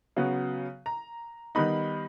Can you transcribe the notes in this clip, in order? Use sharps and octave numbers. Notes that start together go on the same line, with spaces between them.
C#3 F#3 B3
A#5
D#3 G3 B3 D#4 B5